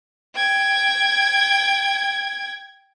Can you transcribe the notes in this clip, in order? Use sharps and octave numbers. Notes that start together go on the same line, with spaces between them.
G5 G#6